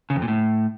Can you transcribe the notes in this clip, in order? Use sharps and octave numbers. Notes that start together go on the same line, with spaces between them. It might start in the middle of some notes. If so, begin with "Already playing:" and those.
C#3
F2
A#2
A2